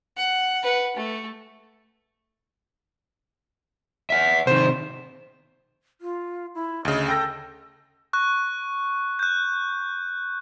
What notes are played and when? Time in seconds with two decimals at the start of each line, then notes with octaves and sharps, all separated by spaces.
0.16 F#5
0.63 B4 F#5
0.96 A3
4.10 E5 F#5 B6
4.47 C3 D#3 C5 E7
6.01 F4
6.55 E4
6.85 D2 C#3 D#5
7.08 A4 G5 G6 A#6
8.13 C#6 F#6
9.19 F#6 G6